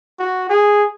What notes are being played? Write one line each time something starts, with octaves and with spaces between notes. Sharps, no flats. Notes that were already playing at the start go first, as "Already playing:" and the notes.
F#4
G#4